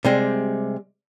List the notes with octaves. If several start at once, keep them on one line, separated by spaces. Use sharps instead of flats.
C3 G3 G#3